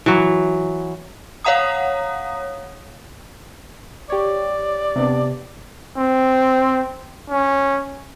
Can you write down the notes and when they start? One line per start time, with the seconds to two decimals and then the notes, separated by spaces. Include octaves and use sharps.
0.06 E3 F#3
1.44 C#5 F5 F#5 A#5 D#6
4.10 G4 C#5 D5
4.96 C3 B3 D4
5.98 C4
7.30 C#4